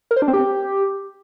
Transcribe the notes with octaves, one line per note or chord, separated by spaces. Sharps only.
A#4
C5
D4
C4
G4